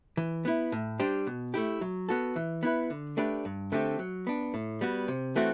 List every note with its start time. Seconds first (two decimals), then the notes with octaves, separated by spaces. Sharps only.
0.17 E3
0.45 B3 E4
0.72 A2
1.00 G3 D4 G4 C5
1.27 B2
1.54 A3 E4 G4
1.81 F#3
2.09 B3 F#4 A4
2.36 E3
2.63 B3 E4 B4
2.90 D3
3.17 A3 D4 G4 B4
3.45 G2
3.72 D3 A3 C4 G4
3.99 F#3
4.27 B3 D4
4.54 A2
4.81 G3 B3 F#4
5.08 C3
5.36 E3 A3 C4 F#4